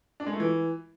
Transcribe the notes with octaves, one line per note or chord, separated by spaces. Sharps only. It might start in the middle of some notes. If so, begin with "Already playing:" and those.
D4
G#3
A3
E3